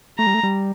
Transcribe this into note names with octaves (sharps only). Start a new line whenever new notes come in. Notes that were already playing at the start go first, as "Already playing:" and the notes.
A3 A#5
G3
A3
G3